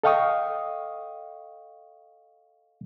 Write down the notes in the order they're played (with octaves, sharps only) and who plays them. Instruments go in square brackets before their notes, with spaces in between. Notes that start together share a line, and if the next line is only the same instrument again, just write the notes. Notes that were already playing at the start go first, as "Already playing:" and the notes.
[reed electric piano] A4 D#5 F5 G5 C#6 D#6